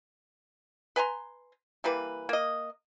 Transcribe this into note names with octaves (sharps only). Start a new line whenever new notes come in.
B4 G#5 A#5 C6
E3 G3 A#3 B4
A#3 D#5